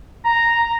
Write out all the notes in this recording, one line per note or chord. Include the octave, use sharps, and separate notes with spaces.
A#5